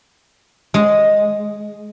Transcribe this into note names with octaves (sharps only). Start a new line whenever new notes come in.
G#3